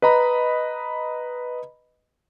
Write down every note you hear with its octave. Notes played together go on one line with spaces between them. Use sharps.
B4 D#5 A#5 B5